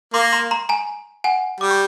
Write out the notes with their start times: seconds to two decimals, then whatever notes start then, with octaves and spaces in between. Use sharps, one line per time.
0.14 A#3 C6 D6
0.33 A#5 C6
0.51 A#5 C6
0.69 G#5 A#5
1.24 F#5 G#5
1.61 G3 D6
1.71 C#6